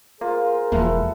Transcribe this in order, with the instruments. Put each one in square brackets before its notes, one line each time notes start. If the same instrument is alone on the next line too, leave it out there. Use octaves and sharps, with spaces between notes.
[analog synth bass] A#3 [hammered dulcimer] F4 [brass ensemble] G#4 A#4 C5
[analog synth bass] E1 [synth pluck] F3 A#3 [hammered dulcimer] E4 F#4 A4